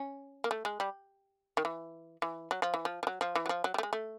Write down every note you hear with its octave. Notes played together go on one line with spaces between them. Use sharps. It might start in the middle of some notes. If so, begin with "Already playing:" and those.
Already playing: C#4
A#3
A3
G#3
G3
D#3
E3
E3
F#3
F3
E3
F3
F3
F#3
F3
E3
F#3
F3
F#3
G3
A3
G#3
A3